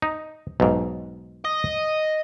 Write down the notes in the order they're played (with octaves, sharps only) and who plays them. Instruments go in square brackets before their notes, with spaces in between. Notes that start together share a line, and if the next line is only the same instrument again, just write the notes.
[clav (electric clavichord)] D#4
B1 G#2
[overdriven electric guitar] D#5